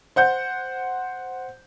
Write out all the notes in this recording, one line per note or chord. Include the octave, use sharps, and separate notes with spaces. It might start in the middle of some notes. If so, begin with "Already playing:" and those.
C5 F#5 G6